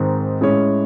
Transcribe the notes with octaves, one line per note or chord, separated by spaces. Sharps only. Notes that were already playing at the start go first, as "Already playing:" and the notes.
Already playing: G#2 D#3 G#3 C4 D#4
A2 G#3 C#4 G#4 C#5